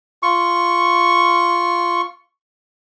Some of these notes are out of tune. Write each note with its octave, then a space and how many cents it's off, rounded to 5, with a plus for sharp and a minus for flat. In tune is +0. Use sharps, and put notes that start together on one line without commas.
F4 -5 C#6 +0